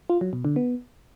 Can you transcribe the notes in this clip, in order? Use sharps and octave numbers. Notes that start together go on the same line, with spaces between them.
F4
F#3
B2
D3
B3